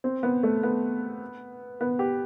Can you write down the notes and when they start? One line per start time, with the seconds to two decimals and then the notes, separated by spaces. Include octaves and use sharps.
0.04 C4
0.23 B3
0.43 A3
0.63 B3
1.81 B3
1.99 G4